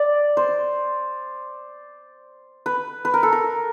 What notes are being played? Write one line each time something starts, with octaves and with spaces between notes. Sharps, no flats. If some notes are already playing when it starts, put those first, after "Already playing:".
Already playing: D5
C5
B4
B4
A#4
A4
A#4